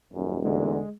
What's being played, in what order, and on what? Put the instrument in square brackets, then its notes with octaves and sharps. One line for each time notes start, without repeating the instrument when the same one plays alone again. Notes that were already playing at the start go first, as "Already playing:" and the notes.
[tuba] D#1 [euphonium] F#2
[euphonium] E2 [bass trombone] D3 [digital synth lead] G#3